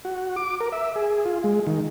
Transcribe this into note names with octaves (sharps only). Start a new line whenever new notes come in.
F#4
D6
A#4
E5
G#4
F4
G#3
D#3